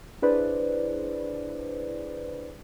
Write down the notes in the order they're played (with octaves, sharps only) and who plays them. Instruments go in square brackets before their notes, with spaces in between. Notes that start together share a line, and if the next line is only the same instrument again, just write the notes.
[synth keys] D4 E4 G#4 B4 C5 D5